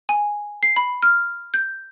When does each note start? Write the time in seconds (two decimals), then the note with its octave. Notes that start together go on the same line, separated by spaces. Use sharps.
0.09 G#5
0.63 C7
0.76 B5
1.03 F6
1.54 G6